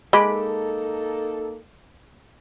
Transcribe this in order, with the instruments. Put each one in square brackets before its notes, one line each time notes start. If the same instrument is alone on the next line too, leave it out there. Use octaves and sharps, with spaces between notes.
[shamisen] G#3 [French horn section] A#3 D#4 A4 [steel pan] B5 D6